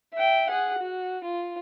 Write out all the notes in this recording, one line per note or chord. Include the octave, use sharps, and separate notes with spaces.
E5 G5
G#4 F#5
F#4
F4